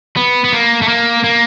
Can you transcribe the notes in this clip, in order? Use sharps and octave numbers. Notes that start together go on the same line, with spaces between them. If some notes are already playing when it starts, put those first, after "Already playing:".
B3
B3
A#3
A3
A#3
A#3